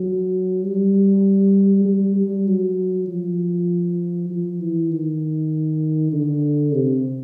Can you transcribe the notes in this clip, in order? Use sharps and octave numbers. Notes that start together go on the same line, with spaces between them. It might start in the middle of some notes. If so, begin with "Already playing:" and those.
Already playing: F#3
G3
G3
G3
F#3
F3
F3
E3
D#3
D3
C3